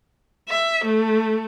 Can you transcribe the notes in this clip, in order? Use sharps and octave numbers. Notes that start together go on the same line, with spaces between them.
E5
A3